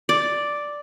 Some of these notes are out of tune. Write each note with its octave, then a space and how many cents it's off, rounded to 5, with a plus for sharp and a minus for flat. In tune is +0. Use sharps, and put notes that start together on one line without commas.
D5 +0